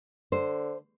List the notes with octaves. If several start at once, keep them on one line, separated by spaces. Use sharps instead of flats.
D3 C5